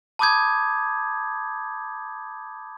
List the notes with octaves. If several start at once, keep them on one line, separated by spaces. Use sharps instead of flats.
A5 B5 D6 D#6 G6 G#6